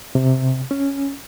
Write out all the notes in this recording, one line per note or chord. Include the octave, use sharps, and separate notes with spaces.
C3
C#4